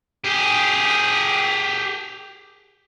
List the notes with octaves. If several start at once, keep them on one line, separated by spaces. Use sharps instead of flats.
G4 G#4